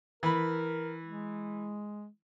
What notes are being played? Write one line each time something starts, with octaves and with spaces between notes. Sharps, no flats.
E3 A#4 B5
G#3